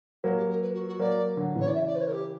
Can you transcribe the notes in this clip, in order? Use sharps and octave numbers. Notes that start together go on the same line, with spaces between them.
F#3 A#3 F#4
G4
A#4
B4
F#4
F#4
F#3 A#3 D5
D3 F#3
C#3 E3 C#5
D5
E5
D5
B4
C#5
A#4
G4